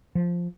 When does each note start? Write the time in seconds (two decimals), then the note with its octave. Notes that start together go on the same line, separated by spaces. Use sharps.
0.15 F3